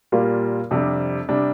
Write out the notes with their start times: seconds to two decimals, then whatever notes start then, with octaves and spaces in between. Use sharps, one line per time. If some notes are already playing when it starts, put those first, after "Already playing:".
0.12 A#2 G3 A#3 F4 A#4
0.71 F2 C3 G3 D4
1.29 C3 G3 D4